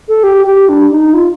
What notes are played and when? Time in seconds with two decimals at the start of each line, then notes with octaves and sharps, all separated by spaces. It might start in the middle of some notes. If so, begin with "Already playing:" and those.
0.09 A4
0.23 G4
0.46 G4
0.69 D4
0.91 D#4
1.14 F4